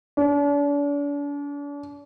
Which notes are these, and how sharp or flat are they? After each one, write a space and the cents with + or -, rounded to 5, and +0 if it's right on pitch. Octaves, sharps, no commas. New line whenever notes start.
D4 -40